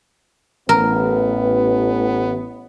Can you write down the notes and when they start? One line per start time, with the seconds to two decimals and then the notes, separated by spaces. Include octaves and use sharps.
0.69 A1 B3 A#4 B4